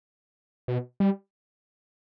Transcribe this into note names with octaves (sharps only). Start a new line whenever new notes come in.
B2
G3